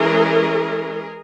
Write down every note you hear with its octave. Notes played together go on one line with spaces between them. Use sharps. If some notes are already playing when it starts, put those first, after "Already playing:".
Already playing: E3 G#3 C#4 G#4 A#4